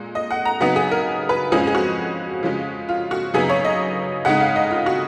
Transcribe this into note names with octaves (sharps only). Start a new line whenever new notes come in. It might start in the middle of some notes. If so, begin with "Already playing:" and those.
Already playing: A#2 G#3
D#5
F#5
A#5
C#3 F#3 B3 D#4 F#5
G#4
A#4
B4
F2 F3 G#3 C#4 G#4
G#4
F#4
C#3 F3 G#3 C#4
F4
F#4
F#2 C#3 F#3 B3 D#4 G#4
C#5
D#5
C#3 G#3 D#4 F#5
F5
D#5
F4
F#4